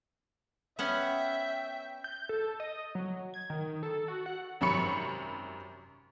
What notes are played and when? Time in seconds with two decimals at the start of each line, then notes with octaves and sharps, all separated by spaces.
0.79 B3 C#4 E5 F#5 G5
2.04 G6
2.29 A4
2.60 D#5
2.95 F#3
3.34 G#6
3.50 D#3
3.83 A4
4.08 F#4
4.26 F#5
4.61 G#1 F#2 C3 B5 C#6 C#7